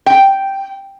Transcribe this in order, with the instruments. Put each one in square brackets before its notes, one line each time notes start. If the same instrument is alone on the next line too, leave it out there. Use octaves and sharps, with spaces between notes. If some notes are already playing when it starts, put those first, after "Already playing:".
[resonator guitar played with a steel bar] G5